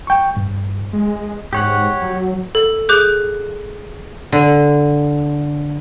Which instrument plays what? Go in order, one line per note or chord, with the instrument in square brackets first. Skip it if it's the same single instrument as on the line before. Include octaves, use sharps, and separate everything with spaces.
[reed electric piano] G5 C#6
G2
[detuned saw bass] G#3
[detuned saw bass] G#2 [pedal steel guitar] G4 C#5 F#5
[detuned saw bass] F#3
[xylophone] A4
G#4 D6 F#6 G6
[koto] D3